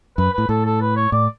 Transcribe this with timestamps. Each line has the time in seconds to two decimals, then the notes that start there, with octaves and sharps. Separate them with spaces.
0.18 F#2 B4
0.33 A2 B4
0.49 A2 A4
0.66 A4
0.81 B4
0.96 C#5
1.12 A2 D5